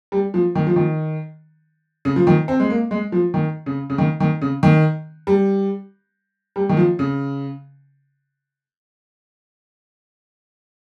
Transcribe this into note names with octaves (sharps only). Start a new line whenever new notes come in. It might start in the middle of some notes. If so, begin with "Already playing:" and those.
G3
F3
D#3
F3
D#3
C#3
F3
D#3
C4
G#3
A#3
G#3
F3
D#3
C#3
C#3
D#3
D#3
C#3
D#3
G3
G3
D#3
F3
C#3